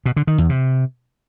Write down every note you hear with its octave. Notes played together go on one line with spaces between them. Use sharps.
B2
D3
D#3
E2
C3